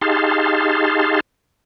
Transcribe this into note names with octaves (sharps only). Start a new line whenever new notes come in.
D#4 G4 G#4 F5 A5 C6